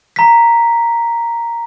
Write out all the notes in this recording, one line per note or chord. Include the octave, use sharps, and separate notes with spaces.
A#5 B6